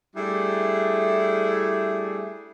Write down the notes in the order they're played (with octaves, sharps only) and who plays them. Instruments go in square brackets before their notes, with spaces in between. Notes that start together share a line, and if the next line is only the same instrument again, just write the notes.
[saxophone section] G3 A3 D4 E4 G#4